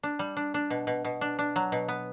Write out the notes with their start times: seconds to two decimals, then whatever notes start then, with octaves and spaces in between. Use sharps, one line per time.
0.03 D4
0.19 G3
0.37 D4
0.54 D4
0.70 B2
0.87 B2
1.05 B2
1.21 D4
1.39 D4
1.56 F#3
1.72 B2
1.88 B3